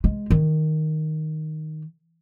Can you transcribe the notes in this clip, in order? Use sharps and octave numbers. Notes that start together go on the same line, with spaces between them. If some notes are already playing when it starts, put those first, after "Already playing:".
G#3
D#3